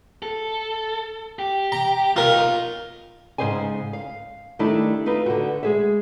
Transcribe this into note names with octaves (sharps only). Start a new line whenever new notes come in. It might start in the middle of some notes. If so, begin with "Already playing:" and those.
A4
G4
A#5
B2 D#4 F4 A#4
G#2 C#3 C5 D#5 G#5
F5
D#3 G3 A3 D4 E4
A3 D#4 F4 B4
D3 F#4
G#3 G#4 E5